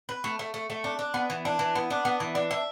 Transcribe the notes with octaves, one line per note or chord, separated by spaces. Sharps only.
B4
A3
A3
A3
A3
D4
D4
B3
E3
D4
E3
B3
D4
B3
E3
D4
E5